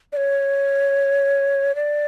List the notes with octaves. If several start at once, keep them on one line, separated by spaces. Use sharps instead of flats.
D5
C#5
D5